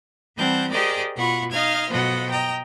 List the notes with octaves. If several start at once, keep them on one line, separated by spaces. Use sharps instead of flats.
E3 G3 C4 F#5 A5 G6
G4 G#4 A#4 C5 D5 D#5
B2 F4 F#5 B5 C#6
D#4 D#5 F5 F6 G#6
B2 F3 F#3 A4 D#5 F#5
D#5 G5 A#5